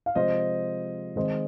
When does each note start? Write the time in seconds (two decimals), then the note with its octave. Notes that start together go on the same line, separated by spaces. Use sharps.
0.06 F5
0.15 C3 F3 G#3 C5 D#5
1.16 D#3 G#3 C4 C5 D#5